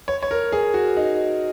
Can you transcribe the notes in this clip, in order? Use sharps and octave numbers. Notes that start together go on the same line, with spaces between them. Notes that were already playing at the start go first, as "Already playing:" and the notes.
C#5
C#5
A#4
G#4
F#4
D#4